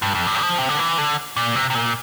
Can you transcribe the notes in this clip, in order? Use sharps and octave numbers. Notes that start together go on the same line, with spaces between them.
G2
F2
G2
F3
C3
D3
E3
D3
A#2
C3
C3
A#2